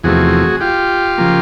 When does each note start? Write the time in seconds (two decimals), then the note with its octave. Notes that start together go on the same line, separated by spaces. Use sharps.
0.04 E2 C3 F3 A3 F#4 G#4
0.61 F4 G4
1.18 C#3 F3 A#3